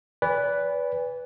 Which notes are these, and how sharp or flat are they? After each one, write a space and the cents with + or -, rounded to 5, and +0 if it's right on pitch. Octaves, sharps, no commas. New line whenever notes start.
B4 +0 D5 -30 G#5 -40